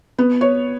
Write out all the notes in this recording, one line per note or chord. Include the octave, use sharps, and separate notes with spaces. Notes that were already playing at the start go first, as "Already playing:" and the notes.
B3
C#5